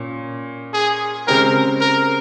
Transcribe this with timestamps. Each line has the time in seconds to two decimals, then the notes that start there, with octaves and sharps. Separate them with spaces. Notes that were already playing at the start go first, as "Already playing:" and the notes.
Already playing: A#2 C#4
0.74 G#4
1.27 C#3 G#3 C4 G4 A#4
1.81 A#4